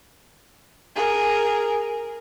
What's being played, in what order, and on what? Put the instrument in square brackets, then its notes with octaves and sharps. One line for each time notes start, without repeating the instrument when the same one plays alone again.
[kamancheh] G#4 A#4